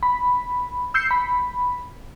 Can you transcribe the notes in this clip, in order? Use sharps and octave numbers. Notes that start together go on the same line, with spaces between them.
B5
E6 G6 C7 C#7
B5